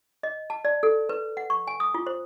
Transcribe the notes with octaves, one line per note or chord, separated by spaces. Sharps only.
D#5
A5
D5
A4
B4
F#5
C#6
G#5
D#6
F4
C5